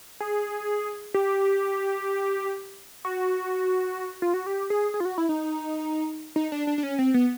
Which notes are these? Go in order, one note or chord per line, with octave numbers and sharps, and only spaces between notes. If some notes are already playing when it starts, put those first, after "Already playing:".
G#4
G4
F#4
F4
F#4
G4
G#4
G#4
F4
F#4
E4
D#4
D#4
D4
D4
D4
C#4
C4
B3